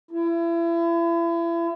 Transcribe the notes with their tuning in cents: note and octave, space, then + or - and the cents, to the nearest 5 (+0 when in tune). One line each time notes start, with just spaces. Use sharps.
E4 +35